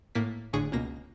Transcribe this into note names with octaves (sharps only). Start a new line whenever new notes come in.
A2 A#3 B6
G1 A2 D3 G#4 C#6
C#2 B2 A#3 A#6